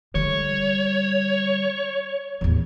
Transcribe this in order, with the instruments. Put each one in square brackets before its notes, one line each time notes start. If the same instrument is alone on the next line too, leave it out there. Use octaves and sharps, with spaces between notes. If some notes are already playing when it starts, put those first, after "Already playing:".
[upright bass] D3 G3 [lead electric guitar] C#5
[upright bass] A1 E2